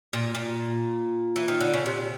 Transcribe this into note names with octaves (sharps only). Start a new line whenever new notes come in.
A#2
A#2
E3
D#3
D3
C#3
C3